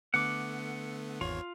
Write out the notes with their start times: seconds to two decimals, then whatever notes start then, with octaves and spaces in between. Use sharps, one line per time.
0.14 D3 A3 B3 F#5 D6
1.21 G#1 E2 F4 C#5